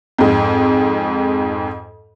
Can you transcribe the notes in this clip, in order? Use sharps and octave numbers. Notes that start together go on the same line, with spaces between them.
F2 G#2